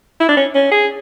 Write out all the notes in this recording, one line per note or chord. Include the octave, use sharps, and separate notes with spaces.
E4
D4
C#4
C#4
G#4